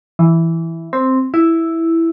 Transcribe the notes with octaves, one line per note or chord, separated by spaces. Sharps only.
E3
C4
E4